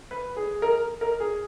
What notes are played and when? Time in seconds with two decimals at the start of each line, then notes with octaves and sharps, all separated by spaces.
0.11 B4
0.36 G#4
0.62 A#4
1.01 A#4
1.20 G#4